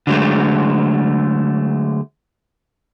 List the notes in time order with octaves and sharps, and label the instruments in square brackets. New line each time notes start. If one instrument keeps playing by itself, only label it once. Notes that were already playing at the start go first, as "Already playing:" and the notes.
[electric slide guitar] D3 F#3 G#3 A3